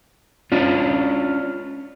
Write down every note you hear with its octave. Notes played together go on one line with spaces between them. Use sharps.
C#4 D4 F4